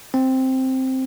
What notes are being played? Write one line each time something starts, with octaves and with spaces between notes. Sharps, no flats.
C4